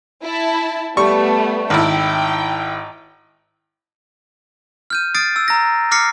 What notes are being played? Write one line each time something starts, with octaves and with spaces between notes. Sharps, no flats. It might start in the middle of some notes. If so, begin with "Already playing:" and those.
E4 A5
G3 A3 B3 C#6
G#1 E4 G5
F6 G6 D#7
D#6 F6 A6 C7 D7
E6
A#5 A#6
D6 F6 A#6 C7 C#7